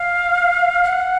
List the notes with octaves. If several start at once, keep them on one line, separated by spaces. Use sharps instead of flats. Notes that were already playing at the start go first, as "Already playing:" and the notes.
Already playing: F5
F#5